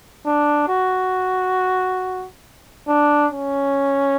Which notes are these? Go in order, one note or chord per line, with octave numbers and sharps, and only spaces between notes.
D4
F#4
D4
C#4